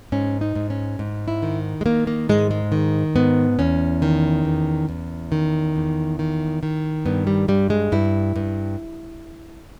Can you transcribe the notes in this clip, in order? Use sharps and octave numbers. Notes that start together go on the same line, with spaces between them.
G#2 C#4
D#4
G#2
C#4
G#2
E4
D#3
G#3
D#3 A#3
A#3
G#2 G#3
G#3
D#3
G#2 B3
E2 C#4
D#3
E2
E2
D#3
E2
D#3
D#3
G2 B3
G3
G2 G3
G#3
G2 E4
G2